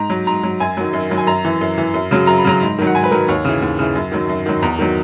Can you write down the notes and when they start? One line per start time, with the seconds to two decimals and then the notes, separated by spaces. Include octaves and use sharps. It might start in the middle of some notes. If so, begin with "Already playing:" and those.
Already playing: G#2 A#5
0.10 F#3
0.27 G#2 A#5
0.43 F#3
0.60 F#2 G#5
0.77 D#3 F#3
0.93 F#2
1.10 D#3 F#3
1.17 G#5
1.27 F#2 A#5
1.45 E3
1.61 F#2
1.78 E3
1.94 F#2
2.11 C#3 F#3
2.27 F#2 A#5
2.38 B5
2.44 C#3 F#3 A#5
2.61 G#2
2.79 D#3 F#3
2.87 F#5
2.95 G#2 G#5
3.04 B4
3.11 D#3 F#3 A#4
3.28 D#2 C#5
3.45 C#3 E3
3.62 D#2
3.79 C#3 E3
3.96 F#2
4.12 D#3 F#3
4.29 F#2
4.46 D#3 F#3
4.62 E2 A#5
4.79 D#3 F#3